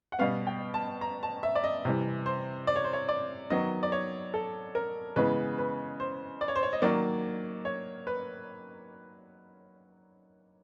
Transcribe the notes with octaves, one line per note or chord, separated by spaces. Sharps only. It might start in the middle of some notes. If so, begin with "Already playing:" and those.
F#5
B2 G3 B3 F5
G5
A5
A#5
A5
E5
D5
D#5
C3 E3 G3
C5
D5
C#5
C5
C#5
D5
D#3 F#3 B3 D#5
D5
C#5
A4
A#4
C#3 E3 G#3 B3 B4
B4
C5
D5
C#5
C5
C#5
D#5
D#3 F#3 A#3 D5
C#5
B4